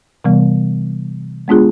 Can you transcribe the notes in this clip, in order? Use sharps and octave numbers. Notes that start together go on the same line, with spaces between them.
C3 E3 G3 B3
G#3 B3 D4 F4 G#4